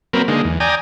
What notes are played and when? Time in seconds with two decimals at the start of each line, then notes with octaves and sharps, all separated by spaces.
0.13 F#3 A#3 C4 A#4 B4
0.28 D3 G#3 A#3 D#4
0.44 E2
0.60 D5 G5 G#5 A#5 D#6